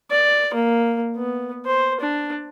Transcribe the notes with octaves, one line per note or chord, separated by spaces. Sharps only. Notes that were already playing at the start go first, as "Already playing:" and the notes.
D5
A#3
B3
C5
D4